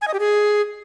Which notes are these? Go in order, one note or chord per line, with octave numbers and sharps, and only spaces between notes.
G#5
D#5
G4
G#4